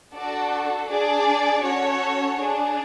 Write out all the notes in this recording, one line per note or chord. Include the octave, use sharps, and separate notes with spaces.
D4 F#4 A4 D5
D4 G#4 D5
C#4 F#4 A4 C#5
D4 G#4